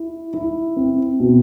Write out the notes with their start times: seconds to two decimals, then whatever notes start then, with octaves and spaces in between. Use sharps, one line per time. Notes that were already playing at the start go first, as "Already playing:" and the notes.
Already playing: E4
0.34 E4
0.76 C4
1.20 B2